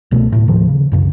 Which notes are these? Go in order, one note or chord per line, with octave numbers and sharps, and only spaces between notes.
C2 B2 G#3 A3
D1 G#1 A2
D#2 A2 D#3 F3
C#3
C2 F#2 C#3